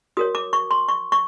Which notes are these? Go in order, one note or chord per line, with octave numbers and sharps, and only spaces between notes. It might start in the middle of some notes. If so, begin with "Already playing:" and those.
F#4 A#4 C#5 D#6
D6
C#6
C6
C#6
C#6